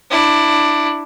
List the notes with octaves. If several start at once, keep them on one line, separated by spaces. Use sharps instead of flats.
D4 E4